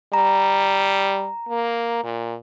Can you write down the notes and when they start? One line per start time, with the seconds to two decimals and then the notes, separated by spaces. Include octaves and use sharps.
0.13 G3 A#5
1.49 A#3
2.04 A#2